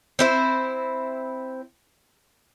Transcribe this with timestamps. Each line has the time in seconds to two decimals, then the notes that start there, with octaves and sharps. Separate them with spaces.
0.19 C4 E4 C5